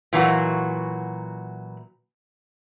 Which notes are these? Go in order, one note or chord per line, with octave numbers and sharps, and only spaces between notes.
A#2 E3 F#3 F#4